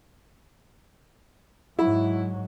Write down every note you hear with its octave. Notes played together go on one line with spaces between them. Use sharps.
G#2 F#3 E4